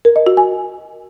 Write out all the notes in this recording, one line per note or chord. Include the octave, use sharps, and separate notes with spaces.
A#4
D#5
F#4
G#5